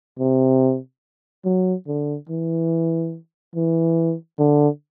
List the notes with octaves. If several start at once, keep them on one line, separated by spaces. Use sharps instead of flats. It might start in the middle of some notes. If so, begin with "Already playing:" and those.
C3
F#3
D3
E3
E3
D3